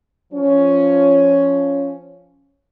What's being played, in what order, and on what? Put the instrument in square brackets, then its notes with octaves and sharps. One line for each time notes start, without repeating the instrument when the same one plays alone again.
[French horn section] F3 C#4